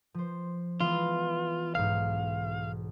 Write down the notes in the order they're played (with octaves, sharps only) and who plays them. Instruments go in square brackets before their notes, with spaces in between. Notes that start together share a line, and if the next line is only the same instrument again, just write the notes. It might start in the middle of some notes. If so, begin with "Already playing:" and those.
[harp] F3 C5
[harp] E3 G#3 B3 [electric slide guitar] F4
[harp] B1 G#2 [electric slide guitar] F5